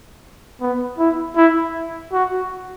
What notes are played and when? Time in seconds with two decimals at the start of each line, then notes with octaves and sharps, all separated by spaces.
0.61 B3
0.98 E4
1.36 E4
2.13 F#4